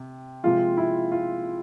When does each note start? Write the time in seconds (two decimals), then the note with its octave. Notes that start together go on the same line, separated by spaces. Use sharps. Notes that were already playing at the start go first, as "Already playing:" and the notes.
Already playing: C3
0.44 C3 F3 G#3 F4
0.77 E4
1.12 F4